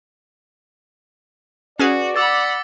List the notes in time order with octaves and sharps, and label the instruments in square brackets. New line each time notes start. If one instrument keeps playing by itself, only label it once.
[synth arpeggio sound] C#4 G#4 B4 [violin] F#4 [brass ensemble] D5
[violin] F#5 B5 [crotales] D6 E6 A6